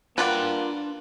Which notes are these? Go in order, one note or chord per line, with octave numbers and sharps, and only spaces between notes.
A#3 D4 F4 B4 D5 F#5 G5